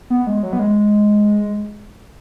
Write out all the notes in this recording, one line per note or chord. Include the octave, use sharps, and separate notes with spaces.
B3
G#3
F#3
B3
G#3